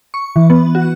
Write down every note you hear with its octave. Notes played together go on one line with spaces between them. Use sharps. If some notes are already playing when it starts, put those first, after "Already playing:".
C#6
E3
B3
F#4